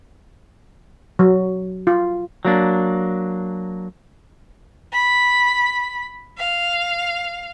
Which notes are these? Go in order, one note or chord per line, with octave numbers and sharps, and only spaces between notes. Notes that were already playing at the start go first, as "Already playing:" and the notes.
F#3
F4
F#3 A#3 D4
B5
F5